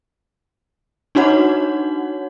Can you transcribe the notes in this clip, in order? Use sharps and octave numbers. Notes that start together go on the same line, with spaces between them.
D4 D#4 F#4 C#5 F#5